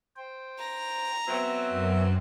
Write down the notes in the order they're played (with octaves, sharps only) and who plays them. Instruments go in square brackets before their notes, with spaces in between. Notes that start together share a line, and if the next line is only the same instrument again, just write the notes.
[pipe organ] C5 G5
[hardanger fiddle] A#5
[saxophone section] F#3 C4 [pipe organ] B3 E5
[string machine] F#2